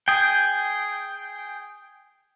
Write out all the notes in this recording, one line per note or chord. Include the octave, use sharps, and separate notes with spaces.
G#4 G5